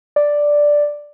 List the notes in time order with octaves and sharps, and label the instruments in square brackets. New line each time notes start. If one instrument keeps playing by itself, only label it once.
[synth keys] D5